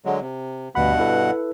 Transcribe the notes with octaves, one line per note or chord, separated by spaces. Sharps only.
D3 F#3 G#3
C3
D2 G2 B2 F#5 B5
E4 A4 B4